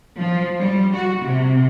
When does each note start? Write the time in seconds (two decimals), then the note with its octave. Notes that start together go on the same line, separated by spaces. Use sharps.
0.19 F3
0.60 G3
0.95 F#4
1.23 C3